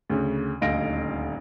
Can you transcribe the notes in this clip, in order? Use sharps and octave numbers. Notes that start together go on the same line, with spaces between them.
D2 C#3
D#1 D2 D#5 F5 A#6 D7